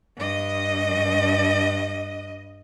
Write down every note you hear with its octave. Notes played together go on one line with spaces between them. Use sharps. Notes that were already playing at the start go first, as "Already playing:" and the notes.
G2 D#5